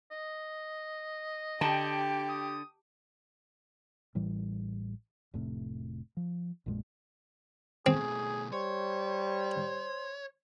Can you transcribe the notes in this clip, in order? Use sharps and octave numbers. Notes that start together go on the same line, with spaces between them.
D#5
D3 G4 G5 A5
D#6
A1 A2 E3 G3
F1 A2 C3
F3
A#1 F#2 A#2 G#3
B2 A3 C4 G#4
G3 C5 C#5